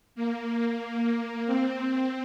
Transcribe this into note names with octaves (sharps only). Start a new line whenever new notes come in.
A#3
A#3
C4